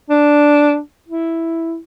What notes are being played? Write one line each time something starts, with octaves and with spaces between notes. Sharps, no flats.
D4
E4